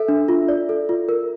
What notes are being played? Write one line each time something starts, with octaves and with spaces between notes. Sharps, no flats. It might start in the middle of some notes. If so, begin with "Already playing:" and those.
Already playing: A4 E5
D4
F4
D5
A4
F4
A#4